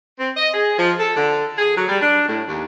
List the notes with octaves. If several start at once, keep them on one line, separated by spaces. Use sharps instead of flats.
C4
D#5
G#4
F3
A4
D3
G#4
F#3
G3
D4
A2
D#2